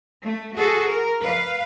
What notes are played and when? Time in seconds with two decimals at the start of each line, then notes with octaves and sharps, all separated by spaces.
0.23 A3
0.55 F#4 G#4 A4
0.88 A#4
1.19 B4 F5